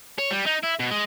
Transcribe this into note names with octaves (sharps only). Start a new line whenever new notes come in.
C#5
G3
D#4
E4
B2
G#3